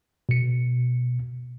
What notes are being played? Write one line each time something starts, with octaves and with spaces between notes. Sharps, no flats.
B2 C#7